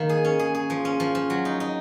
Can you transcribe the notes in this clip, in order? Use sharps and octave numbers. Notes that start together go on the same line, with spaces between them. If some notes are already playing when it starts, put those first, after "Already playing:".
Already playing: D#3 A#3
G#4
C#4
G#4
G#4
F3
C#4
F3
F3
F#3
D#4
D#4